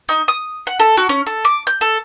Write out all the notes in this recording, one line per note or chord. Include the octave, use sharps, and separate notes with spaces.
D#4
D#6
F#5
A4
F#4
C#4
A4
D6
G6
A4